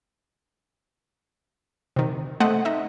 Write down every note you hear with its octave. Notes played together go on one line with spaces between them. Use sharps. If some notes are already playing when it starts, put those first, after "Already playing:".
C3 D#3
A3 C4 C5 D#5 F#5
D#4 D#5 E5